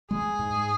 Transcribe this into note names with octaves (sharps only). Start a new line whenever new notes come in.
G#3 G#4
G#2